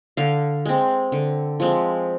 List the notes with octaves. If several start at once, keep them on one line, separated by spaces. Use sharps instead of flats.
D3 F5
G#3 C4
D3
F3 G#3 C4